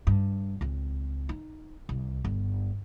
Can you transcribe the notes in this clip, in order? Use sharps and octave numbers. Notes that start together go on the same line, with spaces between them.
G2
C#2 C4
D#4
C2
G1